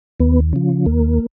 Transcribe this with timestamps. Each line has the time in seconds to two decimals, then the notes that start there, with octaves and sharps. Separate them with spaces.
0.20 D#2 B3
0.53 C#3 F3
0.86 D#2 A#3